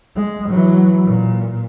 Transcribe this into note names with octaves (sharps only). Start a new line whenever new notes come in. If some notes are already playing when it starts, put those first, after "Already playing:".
G#3
E3 F#3
A#2